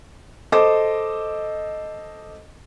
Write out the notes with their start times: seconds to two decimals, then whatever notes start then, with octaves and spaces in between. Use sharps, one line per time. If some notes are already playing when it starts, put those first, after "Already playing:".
0.52 A4 C5 D#5 D6